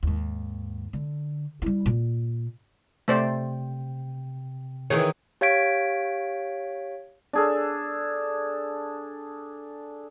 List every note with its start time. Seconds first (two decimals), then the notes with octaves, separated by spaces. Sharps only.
0.03 D#2 G#2
0.93 D3
1.62 G3 E4
1.86 A#2
3.08 C3 A3 C5 D5 G5
4.90 D#3 E3 G#4 C#5
5.41 G4 C#5 F5 G#6 B6 D7
7.33 D4 G#4 A4